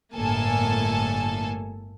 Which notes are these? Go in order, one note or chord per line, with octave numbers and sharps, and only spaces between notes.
G1 A2 A#3 A4 G#5 A5